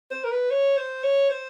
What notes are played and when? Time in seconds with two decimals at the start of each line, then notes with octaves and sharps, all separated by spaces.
0.11 C5
0.24 A#4
0.31 B4
0.51 C#5
0.77 C5
1.03 C#5
1.30 C5